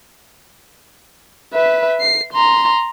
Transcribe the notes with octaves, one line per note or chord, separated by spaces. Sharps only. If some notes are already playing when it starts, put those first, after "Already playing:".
B4 E5
C7
A#5 C6